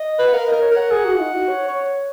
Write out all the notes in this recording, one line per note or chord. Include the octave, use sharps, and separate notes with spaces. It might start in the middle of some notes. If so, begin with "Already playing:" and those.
Already playing: D#5
B4
F#5
A#4 F5
D#5
A#4
C#5
A#4 F#5
G#4
F#4
F4
D#4
F#4
C#5
C#5
C#5